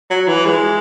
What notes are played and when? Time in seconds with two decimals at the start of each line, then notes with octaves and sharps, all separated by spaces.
0.11 F#3
0.28 E3
0.46 G#3